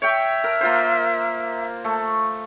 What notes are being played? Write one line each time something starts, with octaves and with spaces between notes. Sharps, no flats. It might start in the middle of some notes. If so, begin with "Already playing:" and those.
C#5 E5 G5
A#4
A#3 F4 C5
A3